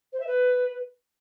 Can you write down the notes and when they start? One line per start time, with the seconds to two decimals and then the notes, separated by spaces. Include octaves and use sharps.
0.12 C5
0.19 E5
0.26 B4